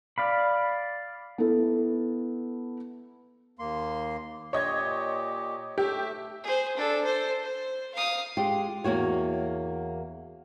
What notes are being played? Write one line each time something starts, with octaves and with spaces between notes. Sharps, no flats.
D5 F5 B5
B3 E4 A4
D#2 A#3 C6
A#2 G4 C#5 D#5 G#6
A3 G4 E5
G#4 C5
D4 A4
A4 C5
C5
F5 D#6
G#3 F4 G4
E2 A#3 F#4 C#5